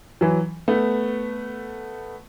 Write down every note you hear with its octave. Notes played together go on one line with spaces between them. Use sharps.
E3 F#3
A3 B3